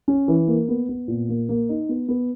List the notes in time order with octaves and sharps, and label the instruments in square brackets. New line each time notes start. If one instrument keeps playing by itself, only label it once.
[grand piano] C#4
E3
A#3
B3
B3
A#2
A#3
A#3
D#4
B3
B3